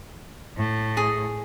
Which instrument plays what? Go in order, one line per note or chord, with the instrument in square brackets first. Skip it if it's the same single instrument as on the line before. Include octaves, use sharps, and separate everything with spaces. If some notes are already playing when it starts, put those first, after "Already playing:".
[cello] A2
[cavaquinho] G#4